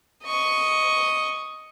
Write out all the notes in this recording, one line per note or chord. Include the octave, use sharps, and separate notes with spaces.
D#5 C#6